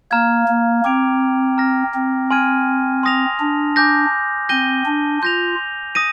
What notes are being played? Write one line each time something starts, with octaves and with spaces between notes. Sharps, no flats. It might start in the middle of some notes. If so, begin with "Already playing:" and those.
A#3 A#5 F6 G#6
A#3
C4 D6 G#6 D7 F7
A#5 F6 A#6
C4
G#5 C6 F6 G#6 D#7
C6 D#6 A#6 F7
D4
G#5 D6 G6 A#6
C4 G6 A#6 D#7 G7
D4
F4 G6 A#6 F7
D#6 A#6 D#7